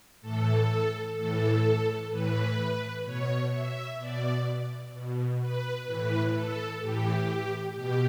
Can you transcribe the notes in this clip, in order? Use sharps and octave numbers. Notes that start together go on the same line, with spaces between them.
A2 E3 A4
A2 E3 A4
A2 E3 B4
B2 C#5
E5
B2 D5
B2
B4
A2 E3 B4
A4
A2 E3 G4
B2 G4